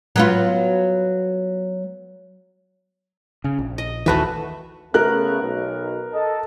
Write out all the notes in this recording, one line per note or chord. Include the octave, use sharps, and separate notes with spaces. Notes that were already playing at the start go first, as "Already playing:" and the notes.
F#3 B3 F4
C#3
A#1
D#5
A#1 D#2 D#3 E3 A3 F#4 B4 E5
C#3 A3 B3 A#4 F#6
B1
A4 D#5 A5